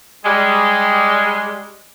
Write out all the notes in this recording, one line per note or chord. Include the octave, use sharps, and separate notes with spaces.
G3 G#3